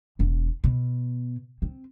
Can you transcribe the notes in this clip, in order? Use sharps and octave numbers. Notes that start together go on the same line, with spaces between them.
E1 E2
B2
C4